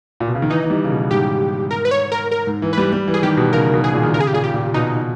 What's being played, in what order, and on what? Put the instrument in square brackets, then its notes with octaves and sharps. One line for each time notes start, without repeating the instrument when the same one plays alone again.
[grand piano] A#2
B2
C#3
D#3
[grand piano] E3 [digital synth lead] D#4
[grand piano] E3
G3
C#3
B2
[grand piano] G#2 [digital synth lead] G4
[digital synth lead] A#4
B4
C#5
A#4
A#4
[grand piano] G#2
E3
[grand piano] G3 [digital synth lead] B4
[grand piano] G3
E3
[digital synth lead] G#4
[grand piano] D#3 [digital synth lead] G4
[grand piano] B2
[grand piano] C#3 [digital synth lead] A#4
[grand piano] B2
[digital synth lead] G#4
[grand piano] A#2
D#3
[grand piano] C#3 [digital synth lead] A#4
[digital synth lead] G#4
G4
[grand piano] A#2 [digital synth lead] G#4
[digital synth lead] G4
[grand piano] A#2
[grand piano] B2 [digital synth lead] D#4